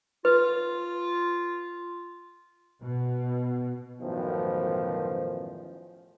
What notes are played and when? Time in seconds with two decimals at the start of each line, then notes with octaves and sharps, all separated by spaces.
0.25 F4 B4
2.82 B2
4.01 A1 F#2 B2 D#3 F3 C5